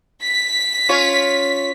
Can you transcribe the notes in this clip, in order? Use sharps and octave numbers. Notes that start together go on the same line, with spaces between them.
B6
C#4 F4 C#5